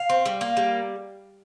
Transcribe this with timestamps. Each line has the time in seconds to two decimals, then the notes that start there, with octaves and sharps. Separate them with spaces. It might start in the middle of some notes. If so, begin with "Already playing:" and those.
Already playing: F5
0.10 C4
0.26 G3
0.41 A#3
0.57 G3